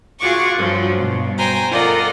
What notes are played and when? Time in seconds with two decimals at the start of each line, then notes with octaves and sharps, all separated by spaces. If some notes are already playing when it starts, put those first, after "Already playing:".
0.19 F4 F#4 G#4 F#5 C#6 D6
0.57 G2 F3 F#3
0.98 G2 B2
1.38 C5 G5 G#5 A#5
1.72 F4 A4 A#4 D5 D#5 F#5